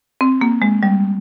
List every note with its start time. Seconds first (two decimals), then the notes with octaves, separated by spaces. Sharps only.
0.21 C4
0.41 A#3
0.62 G#3
0.83 G3